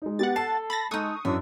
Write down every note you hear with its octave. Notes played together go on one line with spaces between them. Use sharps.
G#3 D#4
B3 G4 F#5 A6
A4 A5 C7
A5 B5 A6 A#6
G#3 D#4 A4 C#6 D#6 F#6
F#2 E3 C#4 D4 E5